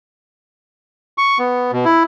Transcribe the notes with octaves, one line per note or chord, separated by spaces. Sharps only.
C#6
B3
B2
E4